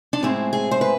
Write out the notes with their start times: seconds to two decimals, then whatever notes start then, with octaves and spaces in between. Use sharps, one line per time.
0.13 D4
0.23 A2 G#3 C4 E4
0.53 G#4
0.71 C5
0.81 B4